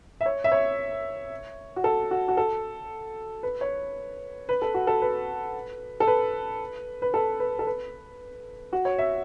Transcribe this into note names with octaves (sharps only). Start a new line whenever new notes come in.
E5
C#5
E5
C#5
F#4
A4
F#4
F#4
A4
B4
C#5
B4
A4
F#4
A4
B4
A4
B4
B4
A4
B4
A4
B4
F#4
C#5
E5